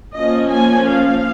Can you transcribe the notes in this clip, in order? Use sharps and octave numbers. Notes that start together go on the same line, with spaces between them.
F3 A#3 C#4 D#5
G#5
F5